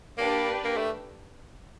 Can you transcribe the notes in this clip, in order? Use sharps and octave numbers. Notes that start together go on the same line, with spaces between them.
A#3 D4 G4 B4
A#3
A3